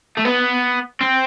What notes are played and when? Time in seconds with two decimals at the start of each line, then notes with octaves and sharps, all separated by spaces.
0.17 A3
0.25 B3
1.01 C4